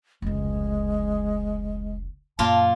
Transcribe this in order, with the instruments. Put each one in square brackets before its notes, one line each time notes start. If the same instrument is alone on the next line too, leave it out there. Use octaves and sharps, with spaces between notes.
[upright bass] F1 C#2 [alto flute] G#3
[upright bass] F#2 [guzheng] A#2 F4 [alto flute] A5